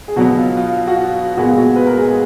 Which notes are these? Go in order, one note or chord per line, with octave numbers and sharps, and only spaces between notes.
G#4
B2 F#3 B3 F#4
F4
F4
F4
F#4
F4
A#2 G#3 B3 F#4
F#4
B4
A#4
G#3 G#4
G#4